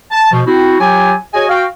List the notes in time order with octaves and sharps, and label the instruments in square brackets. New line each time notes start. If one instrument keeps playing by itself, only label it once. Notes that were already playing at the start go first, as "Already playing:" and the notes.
[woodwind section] A5
B2 F3
C4 E4 F#4
F#3 F4 G4 G5 G#5
F#4 G#4 C#5 D#5 G#5
F#4 F5 G5